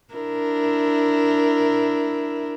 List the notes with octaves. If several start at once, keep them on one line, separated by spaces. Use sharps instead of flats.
D4 E4 A#4